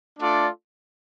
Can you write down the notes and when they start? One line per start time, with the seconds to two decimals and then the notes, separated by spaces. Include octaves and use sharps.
0.20 A3 D4 F4 A4 D5